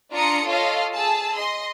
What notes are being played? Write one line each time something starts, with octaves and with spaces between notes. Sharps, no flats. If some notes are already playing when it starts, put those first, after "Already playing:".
D4 F4 A#5 D#6 C#7
F4 A4 C#5 D#5 F5
G#4 A5 E6
D#5 C6